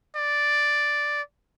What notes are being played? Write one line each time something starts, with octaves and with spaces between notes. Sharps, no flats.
D5